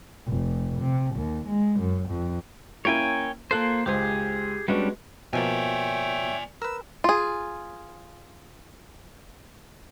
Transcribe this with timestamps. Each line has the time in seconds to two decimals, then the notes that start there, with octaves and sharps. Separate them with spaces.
0.27 F1
0.81 C3
1.15 D#2
1.47 G#3
1.79 F#2
2.09 F2
2.85 A#3 C#4 E4 C#5 G5 G#5
3.51 A#3 F4 A4 C5 F#6
3.86 C#2 G4 G#4 C5
4.68 G3 G#3 B3 C#4 D4 F#4
5.33 B2 F3 A#3 C#5 D5 E5 G5 G#5
6.62 A#4 B4 E6
7.04 F4 G#4